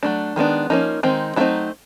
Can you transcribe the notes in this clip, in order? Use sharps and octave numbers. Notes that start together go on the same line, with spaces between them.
F#3 A3 D4
D#3 G#3 B3 D4
F3 A#3 C#4 D#4
D#3 G#3 C4 D#4
F#3 A3 C4 D#4 E4